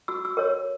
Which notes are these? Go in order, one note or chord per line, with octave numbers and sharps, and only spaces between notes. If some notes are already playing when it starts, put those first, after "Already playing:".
F#4 E6
E6
A#4 C#5